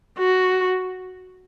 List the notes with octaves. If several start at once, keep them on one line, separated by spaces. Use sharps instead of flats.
F#4